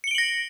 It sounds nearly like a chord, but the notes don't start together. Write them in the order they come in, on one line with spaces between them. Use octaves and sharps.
C#7 G7 D7 F#7 A#6